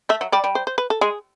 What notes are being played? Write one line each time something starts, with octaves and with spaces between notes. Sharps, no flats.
A3 E5
F#3
G3 D5
G3
C5
C5
B4
A4
G#3 G#4